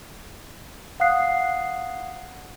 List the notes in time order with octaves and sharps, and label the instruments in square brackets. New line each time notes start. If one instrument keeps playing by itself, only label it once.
[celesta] F5 F#5 D#6 F#6 C7